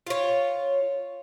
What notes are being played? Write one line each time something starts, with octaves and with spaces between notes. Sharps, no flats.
F4 C#5